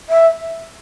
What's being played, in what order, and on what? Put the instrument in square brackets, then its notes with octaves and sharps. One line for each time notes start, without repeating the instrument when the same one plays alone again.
[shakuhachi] E5